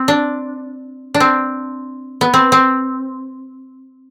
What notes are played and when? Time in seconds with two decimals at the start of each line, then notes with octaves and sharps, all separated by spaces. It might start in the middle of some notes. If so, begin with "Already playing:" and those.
Already playing: C4
0.08 D4
1.14 D4
1.20 C4
2.21 B3
2.34 C4
2.52 C4